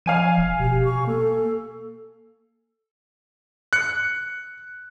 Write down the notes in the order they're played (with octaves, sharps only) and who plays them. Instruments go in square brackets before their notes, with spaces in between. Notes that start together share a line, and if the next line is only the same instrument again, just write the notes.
[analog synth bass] F3 [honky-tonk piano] F5 G#5 D#7
[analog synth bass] E1
[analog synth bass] B2 [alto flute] G4
[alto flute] C#6
[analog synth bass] A#3 [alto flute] A4
[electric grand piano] F#6 C#7